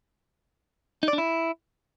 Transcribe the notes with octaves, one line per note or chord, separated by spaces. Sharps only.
D#4
D5
D4
E4